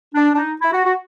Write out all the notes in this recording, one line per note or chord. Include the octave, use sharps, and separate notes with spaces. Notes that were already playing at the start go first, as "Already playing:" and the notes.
D4
D4
D#4
E4
F#4
F#4